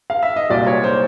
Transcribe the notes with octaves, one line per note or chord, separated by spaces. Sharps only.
F5
E5
D#5
C2 A#2 F#3 D5
C#5
C5